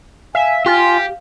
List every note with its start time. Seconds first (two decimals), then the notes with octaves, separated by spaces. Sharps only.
0.35 E5 F5 G#5
0.66 F4 G4 G#5